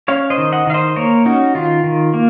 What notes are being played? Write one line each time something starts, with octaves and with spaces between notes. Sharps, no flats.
C#4 C#5 F5
C5 D#5
D#3
D#5 F#5
D#3 F5
C5 D#5
A#3 A#4 C#5
C#4 D#4 F#4
D#3 F4
D#3
A#3